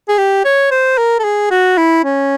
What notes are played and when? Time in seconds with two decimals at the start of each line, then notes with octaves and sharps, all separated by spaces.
0.08 G#4
0.18 G4
0.45 C#5
0.71 C5
0.98 A#4
1.19 A4
1.24 G#4
1.50 F#4
1.78 E4
2.04 C#4